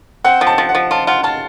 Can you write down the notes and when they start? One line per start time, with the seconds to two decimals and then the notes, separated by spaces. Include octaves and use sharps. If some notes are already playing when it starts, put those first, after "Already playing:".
0.24 C4 F#5
0.41 F3
0.47 A5
0.58 F3
0.69 F#5
0.75 F3
0.91 F4 A5
1.07 F4 F#5
1.23 F4 A5